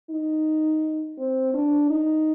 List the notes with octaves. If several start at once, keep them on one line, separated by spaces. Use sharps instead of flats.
D#4
C4
D4
D#4